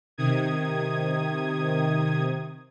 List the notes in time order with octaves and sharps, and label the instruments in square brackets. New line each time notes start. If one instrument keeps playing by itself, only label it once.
[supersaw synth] C3 D#3 D#6 G#6